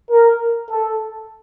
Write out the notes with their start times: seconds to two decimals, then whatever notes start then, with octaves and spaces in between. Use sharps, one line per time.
0.10 A#4
0.69 A4